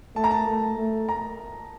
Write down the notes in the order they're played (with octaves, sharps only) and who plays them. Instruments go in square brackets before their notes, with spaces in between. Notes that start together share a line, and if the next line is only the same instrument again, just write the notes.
[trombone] A3 [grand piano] A5
[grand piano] A#5
A5
[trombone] A3
A3
[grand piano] A#5